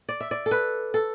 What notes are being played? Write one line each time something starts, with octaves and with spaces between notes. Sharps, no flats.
D5
E5
D5
A4
B4
A4